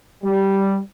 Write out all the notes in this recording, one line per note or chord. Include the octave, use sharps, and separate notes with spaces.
G3